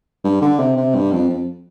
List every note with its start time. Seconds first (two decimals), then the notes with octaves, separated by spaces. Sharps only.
0.24 G2
0.41 D3
0.59 C3
0.77 C3
0.95 G2
1.12 F2
1.29 F2